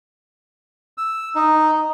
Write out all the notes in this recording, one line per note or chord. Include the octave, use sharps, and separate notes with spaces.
E6
D#4